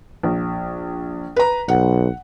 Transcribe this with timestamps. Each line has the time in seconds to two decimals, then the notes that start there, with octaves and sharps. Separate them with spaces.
0.23 A#1
1.36 B4 A#5
1.68 B1 F#5